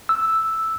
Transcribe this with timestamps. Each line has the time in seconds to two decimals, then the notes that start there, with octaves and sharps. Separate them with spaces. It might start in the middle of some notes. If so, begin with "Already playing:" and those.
0.09 E6